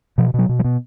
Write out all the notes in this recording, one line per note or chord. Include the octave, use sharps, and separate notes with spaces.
B2 F3
B2 F#3
B2
F#3
B2